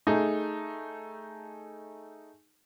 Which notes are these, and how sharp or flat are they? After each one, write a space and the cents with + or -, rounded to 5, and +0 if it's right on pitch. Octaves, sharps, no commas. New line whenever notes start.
A3 +0 D#4 +0 G#4 +0